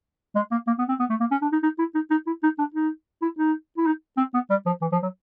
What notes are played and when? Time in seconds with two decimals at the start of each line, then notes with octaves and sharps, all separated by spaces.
0.36 G#3
0.51 A#3
0.67 A#3
0.79 B3
0.89 C4
1.00 B3
1.10 A3
1.20 A#3
1.31 C#4
1.42 D4
1.52 D#4
1.63 D#4
1.79 E4
1.95 D#4
2.11 D#4
2.27 E4
2.43 D#4
2.59 D4
2.74 D#4
3.22 E4
3.38 D#4
3.78 E4
3.86 D#4
4.17 C4
4.34 B3
4.50 G3
4.66 F3
4.82 E3
4.92 F3
5.03 F#3